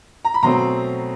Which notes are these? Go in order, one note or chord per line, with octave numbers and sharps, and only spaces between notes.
A#5
B5
B2 F#3 A3 C4 A#5 C6